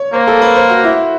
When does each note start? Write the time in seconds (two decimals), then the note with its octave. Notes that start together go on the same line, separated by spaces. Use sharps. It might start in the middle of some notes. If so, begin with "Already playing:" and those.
Already playing: C#5
0.13 A#3 C5
0.27 A4
0.42 B4
0.55 C5
0.69 F#4
0.84 E4